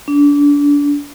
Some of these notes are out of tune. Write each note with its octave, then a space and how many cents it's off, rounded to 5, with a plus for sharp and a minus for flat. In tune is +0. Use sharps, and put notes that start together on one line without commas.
D4 -30